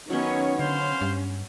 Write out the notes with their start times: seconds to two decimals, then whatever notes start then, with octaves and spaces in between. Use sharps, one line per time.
0.10 D#3 F#3 B3 C#4 C#5
0.59 D3 C#4 C5 F5 C6
1.01 G2